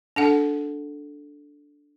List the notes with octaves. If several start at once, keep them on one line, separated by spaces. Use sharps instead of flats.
D4 A4 F#5